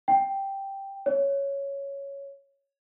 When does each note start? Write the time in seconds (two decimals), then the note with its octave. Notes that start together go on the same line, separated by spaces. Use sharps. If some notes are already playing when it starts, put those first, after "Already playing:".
0.08 G5
1.06 C#5